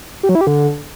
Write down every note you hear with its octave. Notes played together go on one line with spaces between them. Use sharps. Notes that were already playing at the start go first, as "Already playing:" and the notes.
G4
F#3
E4
G4
D3